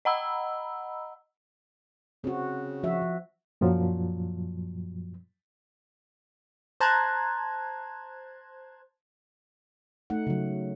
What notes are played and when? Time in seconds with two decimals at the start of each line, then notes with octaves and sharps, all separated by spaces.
0.05 D#5 F#5 A#5 B5 E6
2.24 C#3 C4 F#4
2.83 F3 F#4 E5
3.02 F3
3.61 F#2 A#2 F3 F#3
6.80 C5 A5 A#5 F#6 G#6
10.10 A3 D#4 F#5
10.27 C#3 F#3